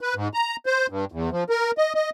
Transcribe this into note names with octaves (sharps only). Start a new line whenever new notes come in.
B4
G#2
A#5
C5
G2
E2
F3
A#4
D#5
D#5